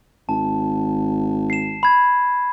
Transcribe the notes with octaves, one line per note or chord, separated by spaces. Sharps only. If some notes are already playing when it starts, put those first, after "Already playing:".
G#1 A5
C7 E7
B5 G#6